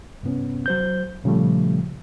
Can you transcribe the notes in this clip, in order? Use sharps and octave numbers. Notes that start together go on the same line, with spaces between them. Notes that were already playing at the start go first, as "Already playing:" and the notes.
G2 C3 B3 C#4
F#3 C5 G6
A#2 C#3 F3 G3 A3